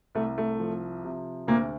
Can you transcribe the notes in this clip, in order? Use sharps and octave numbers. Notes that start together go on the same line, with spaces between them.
C2 A3
A3
F3
C3
D2 A#2 A#3